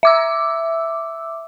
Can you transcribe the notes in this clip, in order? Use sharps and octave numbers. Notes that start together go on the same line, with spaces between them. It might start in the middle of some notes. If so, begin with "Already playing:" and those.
E5 D6 E6